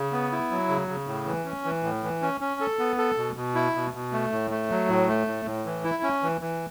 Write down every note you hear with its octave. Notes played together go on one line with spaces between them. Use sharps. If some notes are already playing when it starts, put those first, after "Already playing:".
Already playing: C#3
B3
E4
F#3
C#3
C#3
A2
E3
C#4
E3
A2
E3
C#4
C#4
A4
B3
A4
B2
B2
E4
B2
B2
A3
A2
A3
F#3
A2
A3
A2
A2
E3
E4
C#4
E3
E3